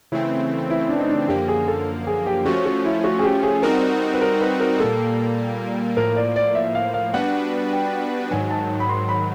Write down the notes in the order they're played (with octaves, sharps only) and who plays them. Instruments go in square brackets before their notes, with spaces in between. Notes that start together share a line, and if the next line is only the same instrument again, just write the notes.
[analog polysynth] C#3 E3 A3 C4 [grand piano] E4
[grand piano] E4
D4
D#4
D4
[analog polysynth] F#2 D3 F3 A#3 [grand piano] G4
[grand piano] G#4
A4
G#4
G4
[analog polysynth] F3 A3 C#4 [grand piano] F#4
[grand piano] F#4
E4
F#4
G#4
G4
G#4
[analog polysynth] G3 C4 D#4 F#4 [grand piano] A#4
[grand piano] B4
A#4
B4
A#4
[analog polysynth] A#2 G3 A#3 [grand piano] A4
[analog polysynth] A2 F3 A#3 [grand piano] A#4
[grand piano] D5
D5
E5
F5
F5
[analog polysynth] G3 B3 D4 F#4 B4 [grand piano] F#5
[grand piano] G5
[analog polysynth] G#2 D#3 F#3 [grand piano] G#5
[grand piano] A5
B5
C6
B5